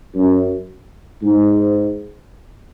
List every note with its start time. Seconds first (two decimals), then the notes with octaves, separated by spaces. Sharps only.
0.14 F#2
1.22 G#2